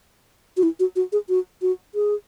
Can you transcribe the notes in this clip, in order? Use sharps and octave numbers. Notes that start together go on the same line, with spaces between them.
F#4
E4
F#4
F#4
G#4
F#4
F#4
G#4